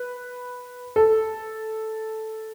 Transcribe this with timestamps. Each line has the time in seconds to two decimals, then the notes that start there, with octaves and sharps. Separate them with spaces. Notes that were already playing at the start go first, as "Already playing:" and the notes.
Already playing: B4
0.96 A4